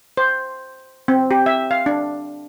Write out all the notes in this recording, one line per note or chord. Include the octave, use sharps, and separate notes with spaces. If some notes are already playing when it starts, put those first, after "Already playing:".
C5
C4
G4
E5
F5
D4